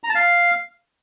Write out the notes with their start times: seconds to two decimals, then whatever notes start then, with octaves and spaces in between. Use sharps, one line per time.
0.04 A#5
0.09 A5
0.15 F5